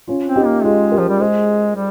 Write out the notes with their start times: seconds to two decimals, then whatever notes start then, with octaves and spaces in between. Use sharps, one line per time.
0.08 C#4 F4
0.27 C4
0.36 D#4 G4
0.45 A#3
0.64 G#3 F4 G#4
0.92 G4 A#4
0.98 F3
1.09 G3
1.20 G#3 G#4 C5
1.76 G3